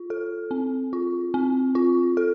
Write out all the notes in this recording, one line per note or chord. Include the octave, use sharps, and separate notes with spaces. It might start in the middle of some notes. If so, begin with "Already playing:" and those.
Already playing: F4
A4
C4
F4
C4
F4
A4